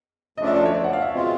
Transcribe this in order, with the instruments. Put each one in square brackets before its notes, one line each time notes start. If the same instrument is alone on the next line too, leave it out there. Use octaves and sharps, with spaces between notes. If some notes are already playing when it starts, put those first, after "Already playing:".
[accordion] D2 C#3 F3 A3 D4 [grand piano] D#5
[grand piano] E5
D5
C#5
D5
F#5
F5
E5
[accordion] B2 G#3 C4 F4